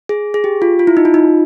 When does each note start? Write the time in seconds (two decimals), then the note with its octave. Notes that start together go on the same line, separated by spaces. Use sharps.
0.09 G#4
0.34 G#4
0.44 G4
0.62 F4
0.79 F4
0.87 E4
0.97 D#4
1.05 F4
1.14 D#4